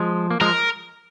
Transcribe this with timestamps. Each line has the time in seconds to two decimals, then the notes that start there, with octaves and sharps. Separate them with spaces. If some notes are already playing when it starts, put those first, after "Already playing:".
Already playing: F3 G#3
0.31 A#3
0.41 F3 G#3 A#4